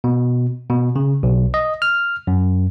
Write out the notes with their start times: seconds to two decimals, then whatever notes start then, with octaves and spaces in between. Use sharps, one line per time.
0.04 B2
0.69 B2
0.96 C#3
1.23 B1
1.54 D#5
1.82 F6
2.27 F#2